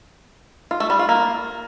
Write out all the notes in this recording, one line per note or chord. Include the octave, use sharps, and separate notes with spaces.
F4
A3
G3
F4
A#3